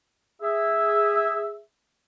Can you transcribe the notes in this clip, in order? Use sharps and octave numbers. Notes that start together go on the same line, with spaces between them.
G#4 E5